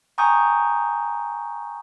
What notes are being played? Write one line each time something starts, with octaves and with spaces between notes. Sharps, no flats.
G5 G#5 A#5 C#6 D#6 G6